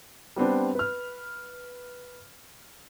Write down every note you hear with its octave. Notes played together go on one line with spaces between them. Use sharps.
G3 B3 C4 D4
B4 F6